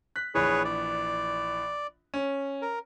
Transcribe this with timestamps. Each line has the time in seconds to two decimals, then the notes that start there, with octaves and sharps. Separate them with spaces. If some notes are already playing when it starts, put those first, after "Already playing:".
0.16 F#6 B6
0.35 A#1 E3 G#4 B4 C#5
0.65 D5
2.14 C#4
2.62 A#4